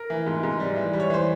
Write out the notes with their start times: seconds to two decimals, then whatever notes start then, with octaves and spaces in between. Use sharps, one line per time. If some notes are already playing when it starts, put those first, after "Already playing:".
Already playing: A#4
0.10 E3
0.27 G#2
0.43 G#2
0.60 G3
0.76 E3
0.93 G3
1.00 C#5
1.10 E3 C5